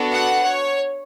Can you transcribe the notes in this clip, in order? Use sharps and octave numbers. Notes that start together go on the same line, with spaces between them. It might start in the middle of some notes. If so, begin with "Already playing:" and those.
Already playing: B3 D4 F#4 A4
F#5
C#5